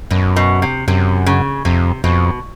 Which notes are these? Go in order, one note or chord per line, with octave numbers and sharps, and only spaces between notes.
F#2 B2
B2
C3
F#2 C3
C#3
F2 C3
F2 B2